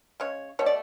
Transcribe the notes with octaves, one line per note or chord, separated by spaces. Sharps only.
C#3 G#3 C#5
B2 A3 C#5
D5